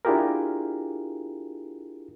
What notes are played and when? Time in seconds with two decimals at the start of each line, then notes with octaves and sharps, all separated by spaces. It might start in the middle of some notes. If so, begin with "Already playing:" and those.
0.05 D4 E4 F4 G4 G#4 A#4